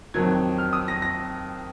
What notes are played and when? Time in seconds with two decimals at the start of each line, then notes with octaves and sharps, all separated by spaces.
0.14 F2 D#3 F#3 G#6
0.58 F6
0.73 D#6
0.88 A#6
1.02 A#6